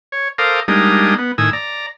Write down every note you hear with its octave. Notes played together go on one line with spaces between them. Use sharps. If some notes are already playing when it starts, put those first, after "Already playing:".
C#5
A4 A#4 C5 F5 D6 D#6
G3 G#3 A#3 D4 D#4 D#6
B3
A2 D#3 G#5 D#6 E6
D5 A#5